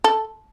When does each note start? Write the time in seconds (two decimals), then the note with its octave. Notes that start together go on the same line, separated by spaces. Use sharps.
0.04 A4